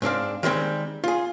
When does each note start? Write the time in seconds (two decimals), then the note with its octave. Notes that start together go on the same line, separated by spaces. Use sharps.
0.02 G#2 C4 D4 F5
0.43 D#3 G3 G#3 C4
1.04 F4 G#4